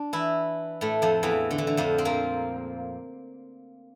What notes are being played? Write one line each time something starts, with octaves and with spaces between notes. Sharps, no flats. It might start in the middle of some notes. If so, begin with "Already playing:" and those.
Already playing: D4
E3 E4
A2 A3
F2 F3
E2 E3
D3
E3
D3
F2 F3
C4
A#2 A#3